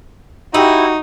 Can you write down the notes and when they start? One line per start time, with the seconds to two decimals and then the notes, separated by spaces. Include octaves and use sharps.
0.54 D#4 E4 F#4 G4